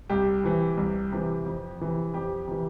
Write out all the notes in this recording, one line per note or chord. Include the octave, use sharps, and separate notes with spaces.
C2 G4
C3 E3
C2
C3 E3
F2
C3 E3
F2 G4
C3 E3